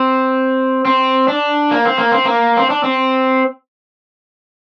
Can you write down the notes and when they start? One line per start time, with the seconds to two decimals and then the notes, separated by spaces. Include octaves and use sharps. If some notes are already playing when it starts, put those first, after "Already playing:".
Already playing: C4
0.85 C4
1.28 D4
1.71 A#3
1.85 C4
1.98 A#3
2.12 C4
2.25 A#3
2.57 C4
2.70 D4
2.84 C4